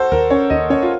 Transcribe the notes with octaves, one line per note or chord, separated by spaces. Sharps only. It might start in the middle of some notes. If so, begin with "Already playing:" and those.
Already playing: F#4 A4 C5
D#2 A#4
C#4 C#5
D#2 D#5
C#4 C#5
F4